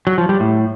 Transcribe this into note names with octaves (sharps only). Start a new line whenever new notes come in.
F#3
F3
G3
A2